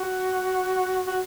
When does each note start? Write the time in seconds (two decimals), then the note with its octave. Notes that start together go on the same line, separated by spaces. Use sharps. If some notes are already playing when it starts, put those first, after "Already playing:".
Already playing: F#4
1.07 F#4